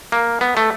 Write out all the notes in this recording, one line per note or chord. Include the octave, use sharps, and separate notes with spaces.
A#3
B3
A3